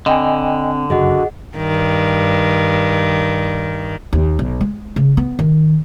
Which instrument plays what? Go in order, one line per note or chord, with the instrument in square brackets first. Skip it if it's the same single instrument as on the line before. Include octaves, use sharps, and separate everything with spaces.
[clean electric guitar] D3 [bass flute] C4 [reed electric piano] D#5 G5 G#5 [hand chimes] B5
[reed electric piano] F#2 C#3 F#3 [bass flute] F#4 [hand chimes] G#4 D#5 F#5
[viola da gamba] G2 D#3
[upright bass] D#2
B1
G#3
C#3
B3
D#3